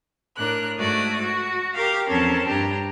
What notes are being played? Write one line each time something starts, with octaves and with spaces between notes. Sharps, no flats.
A2 D4 A#4 F#6
G#2 A3 F#4 D5 D#6
F#4
G4 A#4 F5
E2 F3 C4 C#4 A4 A#4
G2 D4 G4 A#5